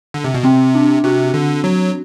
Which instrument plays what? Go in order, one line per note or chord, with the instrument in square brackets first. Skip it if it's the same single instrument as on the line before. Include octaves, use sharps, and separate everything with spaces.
[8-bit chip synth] D3
C3
B2
[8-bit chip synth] C3 [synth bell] C4
[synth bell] D4
[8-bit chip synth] C3 [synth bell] F#4
[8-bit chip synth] D3
F#3